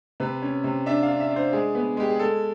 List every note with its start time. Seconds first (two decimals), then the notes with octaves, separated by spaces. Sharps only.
0.20 C3 B4
0.42 C#4
0.64 C3
0.86 D4 E5
1.03 F5
1.08 D4
1.20 E5
1.31 D4
1.36 C5
1.53 G#3 G#4
1.75 B3
1.97 G#3 G4
2.10 G#4
2.19 G#3 A4